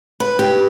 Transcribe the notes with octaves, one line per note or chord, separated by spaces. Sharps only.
B4
G4